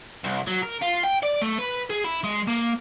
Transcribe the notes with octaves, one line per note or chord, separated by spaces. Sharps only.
C2
F#3
A#4
F4
G5
D5
A3
B4
G#4
E4
G#3
A#3